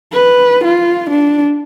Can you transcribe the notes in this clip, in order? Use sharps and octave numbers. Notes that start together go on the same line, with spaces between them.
B4
F4
D4